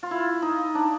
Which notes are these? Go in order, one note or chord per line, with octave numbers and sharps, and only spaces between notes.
F4
E4
D#4
D4